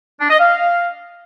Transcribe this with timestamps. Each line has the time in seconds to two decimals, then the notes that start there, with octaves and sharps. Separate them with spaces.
0.21 D4
0.30 D#5
0.40 F5